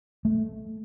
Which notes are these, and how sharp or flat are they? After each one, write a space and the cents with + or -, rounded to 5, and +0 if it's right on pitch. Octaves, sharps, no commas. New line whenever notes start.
A3 -10